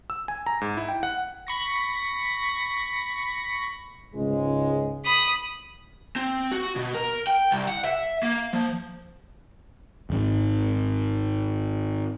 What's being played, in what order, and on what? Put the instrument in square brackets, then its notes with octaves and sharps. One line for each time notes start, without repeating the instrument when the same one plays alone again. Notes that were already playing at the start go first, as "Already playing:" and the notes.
[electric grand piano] E6
G#5
A#5
G#2
E4
G5
F#5
[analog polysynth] B5 C#6 A#6
[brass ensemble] C#2 G#2 G#3
[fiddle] B5 D#6
[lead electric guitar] C4
F#4
B2
A#4
G5
C2
F#5
E5
A#3
F3
[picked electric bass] D#1 G#1